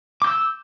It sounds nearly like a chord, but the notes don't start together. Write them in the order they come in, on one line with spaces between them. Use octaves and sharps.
D6 G6 E6